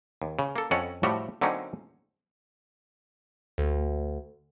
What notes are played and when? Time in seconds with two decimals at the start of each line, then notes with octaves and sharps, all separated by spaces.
0.22 D#2
0.39 C#3
0.56 A#3 A4
0.71 F2 C#4 A4 C#5 D#5 F#5
1.03 A2 F3 G3 A3 F#4 G4
1.41 D3 F#3 A#3 C4 C#4 D#4
3.58 D2